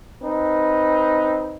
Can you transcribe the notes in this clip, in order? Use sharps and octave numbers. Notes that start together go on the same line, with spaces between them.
C4 D#4 B4